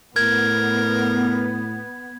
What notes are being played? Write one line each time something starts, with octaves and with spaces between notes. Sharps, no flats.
A2 B3 A#4 G#6